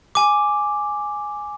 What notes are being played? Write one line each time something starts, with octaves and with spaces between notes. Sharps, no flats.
G#5 D6